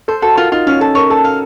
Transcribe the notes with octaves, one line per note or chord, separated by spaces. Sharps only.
A4 C5
F#4 A4
F4 A#4
D#4 F4
C#4 F5
A4 A5
A#4 C#5
A4 A5
F5